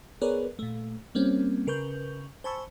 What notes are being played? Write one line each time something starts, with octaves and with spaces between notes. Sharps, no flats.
B3 G#4 A#4 B4 C#5 D5
A#2 A3
G3 A#3 C4 C#4
C#3 A#4 B4 C#6 G6
C5 G#5 A5 B5 C#6 E6